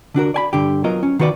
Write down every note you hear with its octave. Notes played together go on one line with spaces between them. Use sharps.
D3 D4 F#4 A#4
D5 G#5 B5
G2 D3 G4
F#3 B3 F4 A#4 D#5
C#4
D#3 B3 F#4 B4 D5